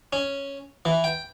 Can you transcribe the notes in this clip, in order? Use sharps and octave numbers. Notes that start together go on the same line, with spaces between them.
C#4
E3
G5